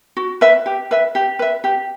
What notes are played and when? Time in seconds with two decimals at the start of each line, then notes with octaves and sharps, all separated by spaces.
0.17 F#4
0.41 B4 E5
0.66 G4
0.91 B4 E5
1.15 G4
1.39 B4 E5
1.64 G4